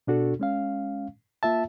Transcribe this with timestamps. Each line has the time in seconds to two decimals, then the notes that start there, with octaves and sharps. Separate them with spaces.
0.07 B2 D4 F#4 A4
0.39 G#3 C#4 F5
1.43 A#3 F4 E5 A5